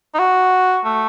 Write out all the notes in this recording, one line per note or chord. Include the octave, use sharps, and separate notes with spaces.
D#4
F#4
A3